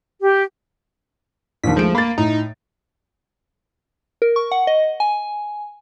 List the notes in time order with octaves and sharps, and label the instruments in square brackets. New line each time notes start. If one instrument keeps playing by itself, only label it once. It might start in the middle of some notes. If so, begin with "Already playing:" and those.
[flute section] G4
[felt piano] A#1 D#2 [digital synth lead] B6
[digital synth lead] F3 [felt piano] G#3 A3 D7
[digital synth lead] A#3 [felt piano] B5 A6
[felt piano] A2 [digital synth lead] D#4
[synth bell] A#4
C#6
F#5
D#5
G#5